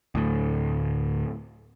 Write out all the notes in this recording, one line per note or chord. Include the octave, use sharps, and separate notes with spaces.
D2 A2